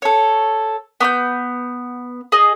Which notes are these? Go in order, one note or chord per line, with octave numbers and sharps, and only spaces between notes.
A4 C#5
B3 D6 G6
G#4 D#5